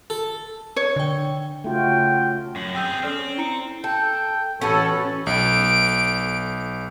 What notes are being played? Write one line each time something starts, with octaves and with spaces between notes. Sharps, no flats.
A4
C#5
D3 G5
C#3 A3 F4 F#4 G5
F#2 C7 F#7
C4 G#4 G5 E6 G6
C4 C#4 A4 D5 F6
E4 A#5 C#7
A4 G5
A1 C#4 F#4 A4 B4 C#5
B1 D7